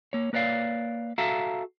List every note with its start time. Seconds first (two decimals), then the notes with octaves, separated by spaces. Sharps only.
0.13 A#3 C#5
0.33 A#3 B4 C#5 D5 F5
1.18 F#4 A4 E5 F5 A5 A#5